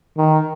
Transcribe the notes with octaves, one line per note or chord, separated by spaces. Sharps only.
D#3